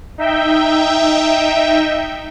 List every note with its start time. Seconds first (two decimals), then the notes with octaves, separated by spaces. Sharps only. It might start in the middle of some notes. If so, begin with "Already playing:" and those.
0.18 D#4 E5 G5